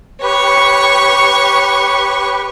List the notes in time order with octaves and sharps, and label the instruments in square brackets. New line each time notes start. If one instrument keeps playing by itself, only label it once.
[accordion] G4 B4 [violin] C#5 C#6